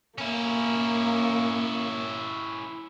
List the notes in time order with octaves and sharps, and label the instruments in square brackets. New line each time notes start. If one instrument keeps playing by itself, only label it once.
[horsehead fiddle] A#3 [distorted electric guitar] C#4 E4